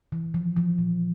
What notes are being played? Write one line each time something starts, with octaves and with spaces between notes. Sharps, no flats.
E3
F3
F3
A#2